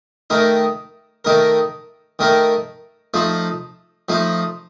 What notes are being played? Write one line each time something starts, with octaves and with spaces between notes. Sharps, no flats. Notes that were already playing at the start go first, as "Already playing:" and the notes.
D#3 A3 D#4 A#4
D#3 A3 D#4 A#4
D#3 A3 D#4 A#4
F3 A3 D#4
F3 A3 D#4